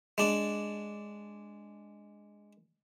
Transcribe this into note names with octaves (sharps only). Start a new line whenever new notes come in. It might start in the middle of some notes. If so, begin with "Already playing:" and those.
G#3 D4